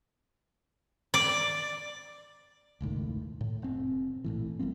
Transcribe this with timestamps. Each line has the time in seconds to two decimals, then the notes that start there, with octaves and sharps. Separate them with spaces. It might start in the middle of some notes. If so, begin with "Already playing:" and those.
1.14 D5
2.81 E1 C#2 A2 D#3
3.41 A2
3.62 F1 C4
4.24 A#1 A2 E3
4.59 G#1 G3 A3 C4